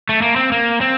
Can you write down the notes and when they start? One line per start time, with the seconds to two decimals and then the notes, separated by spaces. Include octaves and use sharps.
0.09 A3
0.22 A#3
0.36 C4
0.52 A#3
0.81 C4